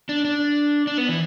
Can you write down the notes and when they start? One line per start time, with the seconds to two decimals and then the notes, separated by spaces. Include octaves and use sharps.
0.09 D4
0.25 D4
0.87 D4
0.98 B3
1.09 E3